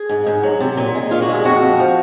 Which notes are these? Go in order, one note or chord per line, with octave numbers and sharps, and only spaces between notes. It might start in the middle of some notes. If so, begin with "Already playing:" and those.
Already playing: G#4
G#2
G#2
F#3
C3
A#2
G#3
A#2 F4
F#4
G#3
G#4
F2 F#4
F2
F3